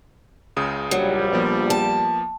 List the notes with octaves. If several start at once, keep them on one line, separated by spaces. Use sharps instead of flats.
C#2 C#3 D#6
A#1 F#3 G3
F3 A#3 B3
A5